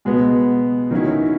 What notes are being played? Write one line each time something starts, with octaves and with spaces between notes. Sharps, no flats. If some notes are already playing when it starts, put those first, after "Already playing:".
B2 G#3 B3
D#3 F#3 C#4 E4